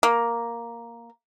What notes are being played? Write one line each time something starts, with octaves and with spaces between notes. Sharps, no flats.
A#3